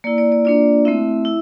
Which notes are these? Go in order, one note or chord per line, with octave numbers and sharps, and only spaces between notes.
A#3 E4 D5
D5
D5
A#3 D4 F4 D5
A3 C4 E4 E5
E4